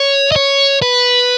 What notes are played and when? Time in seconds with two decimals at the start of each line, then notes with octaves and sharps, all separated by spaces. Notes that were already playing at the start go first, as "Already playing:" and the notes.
Already playing: C#5
0.32 D#5
0.36 C#5
0.82 B4